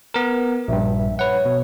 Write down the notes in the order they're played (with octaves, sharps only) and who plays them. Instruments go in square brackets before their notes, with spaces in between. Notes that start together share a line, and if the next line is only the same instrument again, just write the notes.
[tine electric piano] B3 A#4
[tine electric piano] A#1 G2 [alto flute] E5
[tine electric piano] B4 F#5 [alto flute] C#5
[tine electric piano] B2